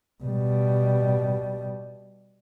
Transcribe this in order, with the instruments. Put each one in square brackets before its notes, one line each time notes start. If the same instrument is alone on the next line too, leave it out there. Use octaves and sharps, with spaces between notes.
[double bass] B2 G3